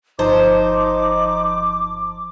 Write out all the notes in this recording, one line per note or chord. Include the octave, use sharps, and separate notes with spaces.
G1 F3 D#4 C5 A5 D6